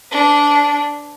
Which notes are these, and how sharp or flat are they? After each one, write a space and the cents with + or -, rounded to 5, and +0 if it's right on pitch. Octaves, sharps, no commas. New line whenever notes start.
D4 -10 B4 +40